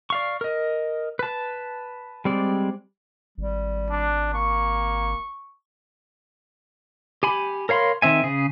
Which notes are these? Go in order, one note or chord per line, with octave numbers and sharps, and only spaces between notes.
D5 F5 C#6
A#4 D#5
B4 A5
G3 G#3 C4 D5
G#1 G3
D4
A#3 C#6
G4 G#5 B5
A#4 C#5 F5 B5 C6
D#3 C4 E5 G#5
C#3 G#4